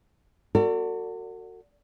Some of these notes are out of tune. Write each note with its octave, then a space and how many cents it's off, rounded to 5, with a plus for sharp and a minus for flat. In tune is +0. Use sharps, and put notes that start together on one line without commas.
F#4 -5 A4 +40 D5 -15